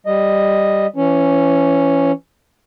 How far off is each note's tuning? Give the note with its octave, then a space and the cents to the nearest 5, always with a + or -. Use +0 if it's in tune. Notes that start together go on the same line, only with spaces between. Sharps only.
G3 +0 D#5 -5
E3 +25 C#4 +0